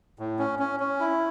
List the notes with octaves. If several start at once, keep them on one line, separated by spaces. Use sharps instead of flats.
A2
C#4
C#4
C#4
E4